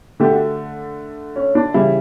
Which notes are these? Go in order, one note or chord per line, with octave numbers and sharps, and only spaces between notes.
D3 A3 G4
F#4
C#4
D4
C#3 E3 G3 E4